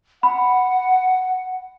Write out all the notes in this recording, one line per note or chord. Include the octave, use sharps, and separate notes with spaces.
F#5 B5